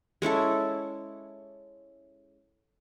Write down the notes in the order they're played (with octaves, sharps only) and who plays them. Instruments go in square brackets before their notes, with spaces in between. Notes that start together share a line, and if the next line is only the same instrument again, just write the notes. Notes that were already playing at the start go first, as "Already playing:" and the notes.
[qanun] G#3 C#4 E4 A4